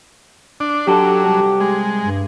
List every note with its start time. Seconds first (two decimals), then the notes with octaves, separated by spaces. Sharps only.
0.60 D4
0.87 F#3 D4 G4 A4
1.25 C2
1.61 G#3
2.04 G2